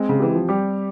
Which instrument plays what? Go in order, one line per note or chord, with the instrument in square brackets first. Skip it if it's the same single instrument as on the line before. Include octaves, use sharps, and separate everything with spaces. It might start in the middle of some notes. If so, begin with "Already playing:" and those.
Already playing: [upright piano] G#3 [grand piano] C4
[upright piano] C#3
[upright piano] E3 [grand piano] G4
[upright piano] F3
[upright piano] G3 [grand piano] G4